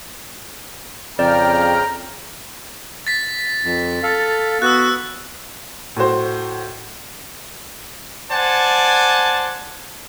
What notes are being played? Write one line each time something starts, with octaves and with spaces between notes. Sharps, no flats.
F2 C#3 D5 G5 A#5 F6
A6 B6
F2
A4 F5
B3 F#4 E6 F#6
A2 F#4 C5
C5 D5 F#5 G#5 A5